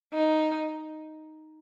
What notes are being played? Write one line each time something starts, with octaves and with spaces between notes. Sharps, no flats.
D#4